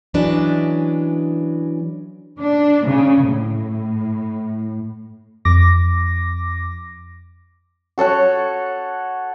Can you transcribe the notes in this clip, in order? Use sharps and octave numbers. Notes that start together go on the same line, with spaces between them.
E3 F#3 G#3 C#4 D4 B4
D4
C#3
A2
F2 D6 A#6
F#4 A4 C#5 F#5